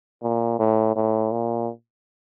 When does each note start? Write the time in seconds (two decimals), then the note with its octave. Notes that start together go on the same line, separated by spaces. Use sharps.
0.23 A#2
0.59 A2
0.96 A2
1.31 A#2